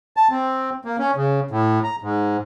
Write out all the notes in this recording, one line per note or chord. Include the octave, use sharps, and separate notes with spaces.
A5
C4
A#3
C#4
C#3
A2
A#5
G#2